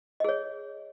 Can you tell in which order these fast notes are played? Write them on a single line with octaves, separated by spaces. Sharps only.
D#5 G#4 C#5